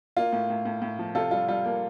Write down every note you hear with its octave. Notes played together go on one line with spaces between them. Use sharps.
A#3 F4
A2
A2
A2
A2
F3
C3 F4 A4
G3 F4
G3 F4
A#3